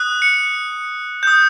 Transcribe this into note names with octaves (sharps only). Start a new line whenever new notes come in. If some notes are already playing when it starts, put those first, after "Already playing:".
Already playing: D#6 F#6
C#7
D#6 G6